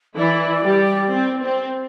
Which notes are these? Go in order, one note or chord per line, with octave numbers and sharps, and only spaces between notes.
E3 E4 D5
G3 G4
C4
C4